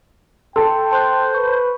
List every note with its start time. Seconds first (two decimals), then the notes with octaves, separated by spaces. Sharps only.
0.56 A4 G5 C6
0.91 C5 A5 C6 F#6
1.35 B4 C#6